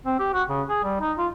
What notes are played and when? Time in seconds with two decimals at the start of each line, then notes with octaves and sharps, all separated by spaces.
0.06 C4
0.19 G4
0.34 F#4
0.48 C#3
0.68 G#4
0.84 G3
1.00 D#4
1.18 F4